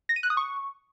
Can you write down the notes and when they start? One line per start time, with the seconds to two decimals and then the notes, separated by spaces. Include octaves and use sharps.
0.09 A#6
0.16 D#7
0.23 F#6
0.30 D#6
0.37 C#6